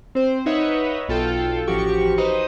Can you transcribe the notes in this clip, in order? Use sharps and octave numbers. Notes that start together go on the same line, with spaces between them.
C4 C5
D#4 B4 C#5 D#5 E5 F#5
B1 F4 A4 G5
A1 F3 F#4 G4 C#6
D#4 B4 C5 D#5